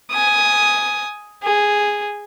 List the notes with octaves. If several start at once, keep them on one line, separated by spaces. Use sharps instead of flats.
G#5 D#6
G#4